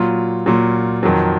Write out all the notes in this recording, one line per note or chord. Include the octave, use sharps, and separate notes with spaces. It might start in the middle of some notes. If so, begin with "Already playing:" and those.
Already playing: A#2 F#3 F4
A#2 F#3
F2 D#3 F#3